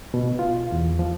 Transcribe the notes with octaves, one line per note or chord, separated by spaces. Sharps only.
B2
F4
E2
F3